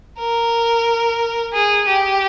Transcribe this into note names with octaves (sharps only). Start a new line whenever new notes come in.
A#4
G#4
G4